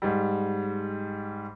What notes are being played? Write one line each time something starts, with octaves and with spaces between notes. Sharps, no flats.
G#2 G3